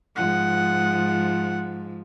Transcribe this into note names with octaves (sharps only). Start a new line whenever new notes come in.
G#2 F3 F#5